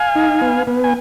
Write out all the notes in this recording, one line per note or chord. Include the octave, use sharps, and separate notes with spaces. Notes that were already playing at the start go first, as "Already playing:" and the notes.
Already playing: F5 G#5
D#4
B3
B3
G#5